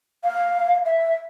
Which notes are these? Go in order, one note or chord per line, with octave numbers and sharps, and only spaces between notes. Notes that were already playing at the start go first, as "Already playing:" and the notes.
F5
E5